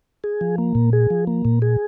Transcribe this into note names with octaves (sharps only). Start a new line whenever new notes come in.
G#4
F3
A#3
A#2
G#4
F3
A#3
A#2
G#4